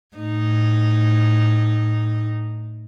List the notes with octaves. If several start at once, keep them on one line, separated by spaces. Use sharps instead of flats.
A2 D#4